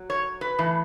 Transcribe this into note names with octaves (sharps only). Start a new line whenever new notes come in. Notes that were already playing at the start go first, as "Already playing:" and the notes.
Already playing: F#3
C#5
B4
A2 E3